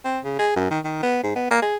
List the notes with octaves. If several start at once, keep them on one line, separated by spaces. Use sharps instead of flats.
C4
C#3
G#4
F#2
D#3
D#3
B3
G#2
B3
A#3
G#4